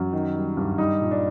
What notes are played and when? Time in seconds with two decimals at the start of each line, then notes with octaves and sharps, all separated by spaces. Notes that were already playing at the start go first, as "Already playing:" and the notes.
Already playing: F#2 F#3
0.13 D#3
0.35 G3
0.57 G2
0.78 G3 D#4
1.01 A#2
1.11 D4